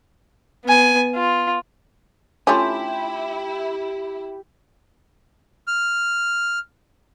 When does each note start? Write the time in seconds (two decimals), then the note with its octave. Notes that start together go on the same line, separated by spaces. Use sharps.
0.65 B3 G#5
1.16 F4
2.47 A3 C#4 D4 E4 F4 G4 C6
5.67 F6